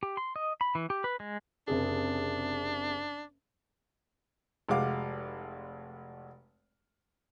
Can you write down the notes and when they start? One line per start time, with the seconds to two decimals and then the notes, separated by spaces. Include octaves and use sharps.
0.03 G4
0.17 C6
0.36 D#5
0.61 B5
0.75 E3
0.90 G4
1.04 B4
1.20 G#3
1.68 F#1 C3 D4 G#4
4.69 F1 G#3 F#4 F5 D6